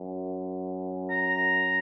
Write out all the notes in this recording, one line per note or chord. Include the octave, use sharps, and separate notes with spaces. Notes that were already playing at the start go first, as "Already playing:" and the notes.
Already playing: F#2
A#5